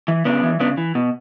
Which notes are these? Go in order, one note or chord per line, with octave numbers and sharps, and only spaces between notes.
E3
C#3 B3 D4
E3
C#3 B3 D4
E3
B2